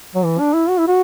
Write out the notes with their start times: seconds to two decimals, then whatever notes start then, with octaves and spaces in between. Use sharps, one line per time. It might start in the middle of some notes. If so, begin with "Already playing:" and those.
0.15 F#3
0.24 E3
0.39 D4
0.53 E4
0.69 F#4
0.78 E4
0.88 F#4